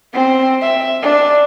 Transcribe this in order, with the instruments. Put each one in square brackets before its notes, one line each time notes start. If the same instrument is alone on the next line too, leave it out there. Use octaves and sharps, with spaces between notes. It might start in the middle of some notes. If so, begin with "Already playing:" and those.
[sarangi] C4
E5
D4